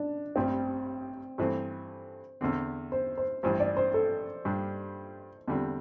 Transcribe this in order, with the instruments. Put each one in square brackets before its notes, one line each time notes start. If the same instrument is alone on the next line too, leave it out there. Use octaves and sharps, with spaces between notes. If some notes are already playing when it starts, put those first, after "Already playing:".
Already playing: [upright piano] D4
[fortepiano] A1 G2 G3 [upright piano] C4
[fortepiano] G2 E3 A3 C4 [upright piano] C5
[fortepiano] E2 D3 C4
[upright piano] C5
C5
[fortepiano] A1 G2 E3 [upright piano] C5
[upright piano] D5
C5
A4
[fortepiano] G2 G3 D4
E2 D3 G3 C4